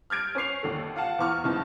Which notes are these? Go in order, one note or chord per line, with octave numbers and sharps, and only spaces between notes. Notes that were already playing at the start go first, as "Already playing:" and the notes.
F6 G6 G#6 D7
C#4 B4 C#6 C7 F7
D#2 D3 A4
F4 F5 F#5 A5
E2 E3 C#6 F6
F#1 C#3 E3 B3 D#4 A5